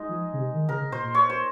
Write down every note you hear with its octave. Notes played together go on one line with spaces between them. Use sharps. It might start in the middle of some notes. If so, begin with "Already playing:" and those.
Already playing: G#3 D#4
F3
C#3
C3
D#3
C#3 A#4
C#3
A#2 C5
A#2
C#5
C5